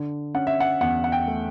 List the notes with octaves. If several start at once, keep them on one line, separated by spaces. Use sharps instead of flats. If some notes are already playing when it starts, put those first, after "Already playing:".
Already playing: D3
C#4 F#5
E5
F#5
E2 F#5
F#5
G5
A3